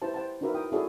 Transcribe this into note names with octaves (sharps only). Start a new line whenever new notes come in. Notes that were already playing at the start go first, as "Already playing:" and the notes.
E4 G4 B4 C5 A5
C5 F#5 G5 A5
D4 D#4 F#4 A#4 B4 E5
E4 G5 D#6
E4 F#4 G#4 A4 C#5 D5